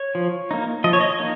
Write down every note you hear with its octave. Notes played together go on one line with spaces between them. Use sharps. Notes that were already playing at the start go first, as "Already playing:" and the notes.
Already playing: C#5
F3
A#3 D#4
F3 D#5
C#5
D#5
A#3 D#4